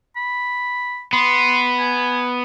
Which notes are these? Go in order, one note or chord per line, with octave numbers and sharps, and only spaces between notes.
B5
B3 C6
G#5